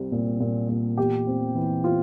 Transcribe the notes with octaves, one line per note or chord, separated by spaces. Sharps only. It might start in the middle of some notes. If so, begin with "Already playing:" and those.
Already playing: C2 G3 C4
A#2
A#2
A#2
E2 G4
C4
E3
C4 F4